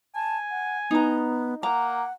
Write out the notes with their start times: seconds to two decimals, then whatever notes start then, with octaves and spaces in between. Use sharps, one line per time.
0.15 G#5 A5
0.51 F#5
0.91 B3 D#4 A#5
1.63 A#3 F#5 A#5